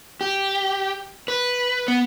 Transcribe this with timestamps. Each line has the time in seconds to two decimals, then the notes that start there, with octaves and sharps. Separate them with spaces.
0.21 G4
1.28 B4
1.88 B3